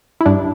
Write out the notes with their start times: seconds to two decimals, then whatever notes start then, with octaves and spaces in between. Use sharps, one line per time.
0.21 E4
0.26 G2 D4